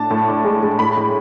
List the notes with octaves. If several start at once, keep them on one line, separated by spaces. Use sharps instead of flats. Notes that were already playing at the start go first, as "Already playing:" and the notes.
Already playing: A2 D4 A5
A2
D4
G#3
G#3
A2 B5
A2